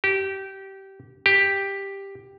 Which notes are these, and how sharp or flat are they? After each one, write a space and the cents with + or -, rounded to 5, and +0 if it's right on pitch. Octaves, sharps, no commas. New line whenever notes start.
G4 -20
G4 +5